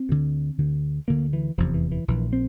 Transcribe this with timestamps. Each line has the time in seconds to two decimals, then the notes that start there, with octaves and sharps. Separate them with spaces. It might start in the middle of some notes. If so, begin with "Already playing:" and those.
Already playing: C4
0.09 D2 D3
0.58 D2 D3
1.08 D2 D3 A#3
1.33 E3
1.58 F1 E2 C3 F3
1.74 E3
1.92 E3
2.08 A#1 A#2 E3
2.33 C4